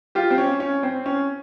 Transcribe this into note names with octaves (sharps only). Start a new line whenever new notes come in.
F4 G4
C4
C#4
C#4
C4
C#4